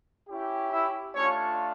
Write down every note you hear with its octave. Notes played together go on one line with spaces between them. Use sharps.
C#4 E4 G4
E4 E5
A3 C#4 D4 F4 C#5